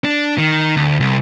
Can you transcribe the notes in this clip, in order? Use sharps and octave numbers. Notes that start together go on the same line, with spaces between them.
D4
D#3
D2
C2